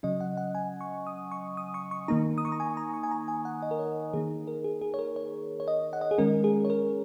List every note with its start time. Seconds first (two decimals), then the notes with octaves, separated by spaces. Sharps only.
0.03 C#3 F#3 C#4 D#5
0.21 F#5
0.37 F#5
0.55 G#5
0.81 C#6
1.07 D#6
1.32 C#6
1.57 D#6
1.74 C#6
1.91 C#6
2.08 D#3 A#3 D#4 A#5
2.38 D#6
2.45 C#6
2.52 A#5
2.60 G#5
2.77 A#5
2.94 C#6
3.03 G#5
3.11 A#5
3.28 G#5
3.45 F#5
3.62 D#5
3.71 A#4
3.79 C#5
4.13 D#3 A#3 D#4 G#4
4.48 A#4
4.64 G#4
4.81 G#4
4.94 C#5
4.99 A#4
5.16 C#5
5.60 C#5
5.68 D#5
5.93 F#5
6.01 D#5
6.11 G#4
6.18 D#3 G#3 C#4 A#4
6.44 G#4
6.65 C#5
6.70 A#4